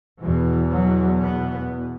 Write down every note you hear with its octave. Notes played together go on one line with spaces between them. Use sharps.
E2 B2 E3
F#3
B3